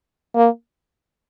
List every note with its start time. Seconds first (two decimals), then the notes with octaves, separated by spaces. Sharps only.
0.35 A#3